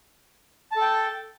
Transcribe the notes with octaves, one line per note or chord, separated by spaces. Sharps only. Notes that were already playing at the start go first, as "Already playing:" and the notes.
A4 G5 A5